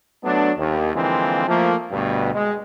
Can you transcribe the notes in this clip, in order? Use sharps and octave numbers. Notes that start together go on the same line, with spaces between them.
F#3 A3 B3 D4
D#2
D3 E3 F3 G#3 A#3 C4
F3 A3 A#3
D2 G2 B2
G#3